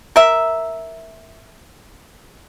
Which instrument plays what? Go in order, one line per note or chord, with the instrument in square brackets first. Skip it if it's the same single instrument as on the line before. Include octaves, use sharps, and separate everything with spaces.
[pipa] A#4 E5